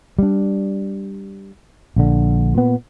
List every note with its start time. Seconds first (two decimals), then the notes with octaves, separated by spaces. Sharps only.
0.19 G3 D4
1.96 A#1 D3
2.54 A#2 B3